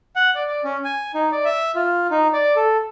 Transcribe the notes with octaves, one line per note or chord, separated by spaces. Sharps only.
F#5
D5
D5
C#4
G#5
D#4
D5
E5
F4
D#4
D5
A4